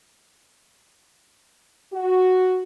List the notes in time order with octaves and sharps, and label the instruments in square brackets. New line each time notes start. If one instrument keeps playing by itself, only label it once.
[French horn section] F#4